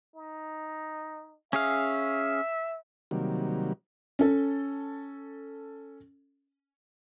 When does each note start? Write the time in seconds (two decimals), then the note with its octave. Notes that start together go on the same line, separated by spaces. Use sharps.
0.16 D#4
1.53 C#4 G#4 E5 F5
3.11 C3 D#3 F#3 G3 A#3
4.19 C#4 A4